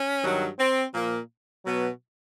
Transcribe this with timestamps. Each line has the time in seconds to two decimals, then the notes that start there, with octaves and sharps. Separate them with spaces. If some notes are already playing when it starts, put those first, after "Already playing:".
Already playing: C#4
0.24 G2 D#3 F#3
0.59 C4
0.94 A#2 F3 A#3
1.65 B2 F#3 B3